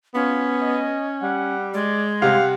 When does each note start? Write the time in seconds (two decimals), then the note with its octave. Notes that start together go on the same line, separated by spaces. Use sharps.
0.15 B3 C#4 F4
0.62 D#5
1.23 G3 F#5
1.74 G#3 D5
2.22 C3 G3 F5 F#5